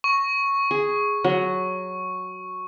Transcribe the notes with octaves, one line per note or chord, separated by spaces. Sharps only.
C#6
G#4
F#3